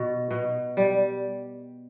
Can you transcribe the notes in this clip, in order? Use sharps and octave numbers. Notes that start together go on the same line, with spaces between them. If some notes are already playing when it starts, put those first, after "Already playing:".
Already playing: B2
B2
G3